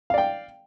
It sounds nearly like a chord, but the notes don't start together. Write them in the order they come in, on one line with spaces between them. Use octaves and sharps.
F5 D5 G5